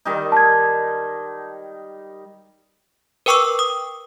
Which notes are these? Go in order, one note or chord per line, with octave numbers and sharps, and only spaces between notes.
D#3 G3 D#4
A5 G#6
A#4 B4 G5 C#6 D6 E6
D#6